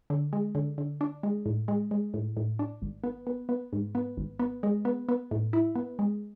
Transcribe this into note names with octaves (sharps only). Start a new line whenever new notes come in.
D3
G#3
D3
D3
D4
G#3
A2
G#3
G#3
A2
A2
D4
G#1
B3
B3
B3
G#2
B3
G#1
B3
G#3
B3
B3
A2
E4
B3
G#3